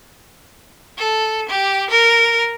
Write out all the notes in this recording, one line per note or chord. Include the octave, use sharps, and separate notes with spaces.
A4
G4
A#4